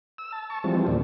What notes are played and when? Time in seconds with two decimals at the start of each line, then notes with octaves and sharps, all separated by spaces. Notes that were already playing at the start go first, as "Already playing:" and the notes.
0.18 E6
0.32 A5
0.50 A5 C#6
0.64 E3 F3 G3 G#3 C4
0.87 D#2 A#2 E3 D4